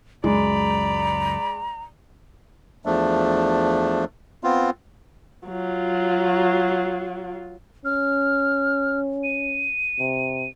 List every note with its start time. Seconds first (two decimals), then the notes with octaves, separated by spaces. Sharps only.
0.24 C#2 F#2 G#3 D5 A#5 B5
2.86 E2 F3 A3 D4
4.44 B3 C4 F4
5.48 F#3 F4
7.85 C#4 F6
9.23 D#7
9.99 C3